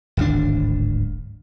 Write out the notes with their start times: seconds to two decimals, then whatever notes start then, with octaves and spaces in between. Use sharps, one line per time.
0.17 D1 G#1 D4